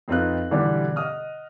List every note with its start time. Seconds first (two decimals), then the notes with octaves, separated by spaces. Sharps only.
0.08 F2 C4 D#4 F4 B4 F#6
0.51 B2 D3 E3 G3 D4 G4
0.96 D#5 F#5 D#6 F6